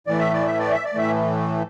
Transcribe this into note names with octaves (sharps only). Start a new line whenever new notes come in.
A2 E3 A3 D5
E5
D5
E5
D5
E5
D5
A2 E3 A3 E5